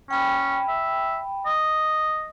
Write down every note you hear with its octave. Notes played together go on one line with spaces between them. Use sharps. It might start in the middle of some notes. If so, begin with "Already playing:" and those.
C#4 G5 B5
E5
D#5